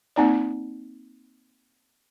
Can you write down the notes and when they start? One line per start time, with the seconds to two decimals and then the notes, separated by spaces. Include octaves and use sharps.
0.16 A#3 C4 D#4 D5